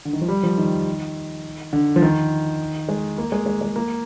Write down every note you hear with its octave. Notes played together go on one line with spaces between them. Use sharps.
D3
D#3
F3
G3
F3
D#3
D3
F3
D#3
G#3
A#3
G#3
G#3
G#3
A#3